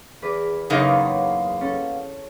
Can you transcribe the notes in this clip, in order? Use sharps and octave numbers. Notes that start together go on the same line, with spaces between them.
E2 B4 D6
F#2 C#3 A#3 B3 D#4 F4 C#5 G#5
C#4 A4